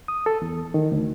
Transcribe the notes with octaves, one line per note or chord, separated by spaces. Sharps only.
D#6
A4
E2
D#3
D2